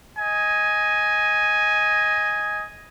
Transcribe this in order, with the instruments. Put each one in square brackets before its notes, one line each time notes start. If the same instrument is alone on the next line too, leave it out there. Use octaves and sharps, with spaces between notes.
[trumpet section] D#5 G#5